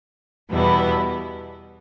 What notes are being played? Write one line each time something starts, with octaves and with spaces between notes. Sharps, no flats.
E2 B2 G3 B3 E4